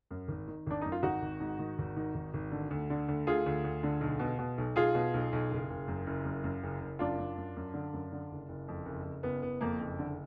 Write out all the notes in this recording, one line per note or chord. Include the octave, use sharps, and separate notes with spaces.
F#2
G#1
D#3
G#1 D4
F#2 D#4
F4
G#1 D#4 F#4
G#1
G#2
D#3
G#1
D#3
G#1
G#1
D3
D2
D3
D2
D2 F4 G#4
D2
D2
D3
B1
B2
B2
B1
B1 F4 G#4
B2
B1
B1
F#1
F#1
F#2
F#1
F#2
F#2
F#1
F#1
F#2 D4 F4
F#2
F#2
F#2
D3
F#2
D3
F#1
F#1
F2
F#1
F#1
F#1 B3
F#1 B3
F2 A#3
F#1
D3